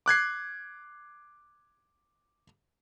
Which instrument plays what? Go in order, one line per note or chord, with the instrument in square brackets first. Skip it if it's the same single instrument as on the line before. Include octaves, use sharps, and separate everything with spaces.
[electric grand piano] D6 F#6 G#6 C7